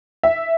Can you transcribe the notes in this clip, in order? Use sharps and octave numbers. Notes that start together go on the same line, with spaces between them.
E5